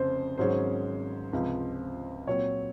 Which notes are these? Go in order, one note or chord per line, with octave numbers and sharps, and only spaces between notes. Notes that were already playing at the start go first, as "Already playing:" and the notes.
Already playing: F1 F2 C#3 C5
G#1 G#2 F#3 C#4 G#4 C5
C#2 C3 F3
A#2 F#3 C4 C#5